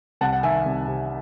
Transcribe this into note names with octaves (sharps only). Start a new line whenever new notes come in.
C2 F#5 A5
F#5
D#3 E5 G#5
C2
C3